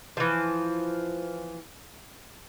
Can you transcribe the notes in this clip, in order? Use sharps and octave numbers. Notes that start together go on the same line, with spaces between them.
E3 F3